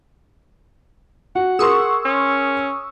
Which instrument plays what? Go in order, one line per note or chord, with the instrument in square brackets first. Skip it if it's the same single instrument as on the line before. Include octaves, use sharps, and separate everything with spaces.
[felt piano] F#4 [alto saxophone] F#5
[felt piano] G#4 A#4 C6 [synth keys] C#6 D#6 E6
[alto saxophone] C#4